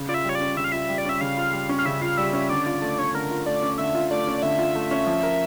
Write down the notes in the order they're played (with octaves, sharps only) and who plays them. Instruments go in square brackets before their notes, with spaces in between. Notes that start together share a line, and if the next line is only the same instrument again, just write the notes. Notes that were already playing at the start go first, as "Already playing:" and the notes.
Already playing: [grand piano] C#3
[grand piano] F4 [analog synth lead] D5
[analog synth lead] E5
[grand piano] G3 [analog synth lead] C#5
[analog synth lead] D5
[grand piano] C#4
[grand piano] C#3 [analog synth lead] E5
[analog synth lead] F5
[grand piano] F4 [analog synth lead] E5
[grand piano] G3
[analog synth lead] D5
[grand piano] C#4 [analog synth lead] E5
[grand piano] C#3 [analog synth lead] F5
[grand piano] F4
G3
C#4
[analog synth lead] F5
[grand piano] C#3 [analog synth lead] E5
[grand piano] F4 [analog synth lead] F5
[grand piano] G3 [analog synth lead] E5
[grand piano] C#4 [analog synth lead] E5
[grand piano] D3 [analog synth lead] D5
[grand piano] F4 [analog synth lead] D5
[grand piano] A3 [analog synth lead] D5
[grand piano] C#4 [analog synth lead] C#5
[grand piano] D3 [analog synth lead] A#4
[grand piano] F4
[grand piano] A3 [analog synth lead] D5
[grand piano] C#4
[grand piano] D3 [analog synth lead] E5
[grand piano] F4
[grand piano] A3 [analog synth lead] D5
[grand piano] C#4
[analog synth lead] D5
[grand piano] D3 [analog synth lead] E5
[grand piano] F4
A3
C#4
F3
A#4